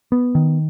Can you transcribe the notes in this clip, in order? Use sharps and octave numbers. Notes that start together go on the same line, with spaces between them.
B3
D#3